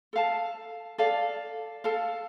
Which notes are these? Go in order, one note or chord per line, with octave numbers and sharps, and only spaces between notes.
A4 F5 A5
A4 D5 F5
A4 F5 A5